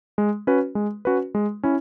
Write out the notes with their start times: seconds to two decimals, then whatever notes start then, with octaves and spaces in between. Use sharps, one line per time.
0.18 G#3
0.47 C#4 F#4 B4
0.75 G#3
1.05 C#4 F#4 B4
1.35 G#3
1.63 C#4 E4